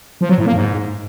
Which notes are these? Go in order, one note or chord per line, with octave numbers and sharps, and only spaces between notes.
F3
F#3
A2
A#3
G#2